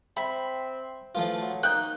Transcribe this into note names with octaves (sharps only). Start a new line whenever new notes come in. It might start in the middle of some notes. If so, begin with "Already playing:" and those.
C4 E5 B5
E3 F3 A3 F4
F#3
A#3 D#4 G5 F#6 G6